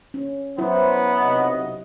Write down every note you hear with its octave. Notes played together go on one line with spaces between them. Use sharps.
C#4
F#3 B3 E4 C5
B1 C3 D#5